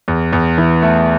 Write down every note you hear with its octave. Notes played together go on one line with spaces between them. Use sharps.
E2
E2
E3
A3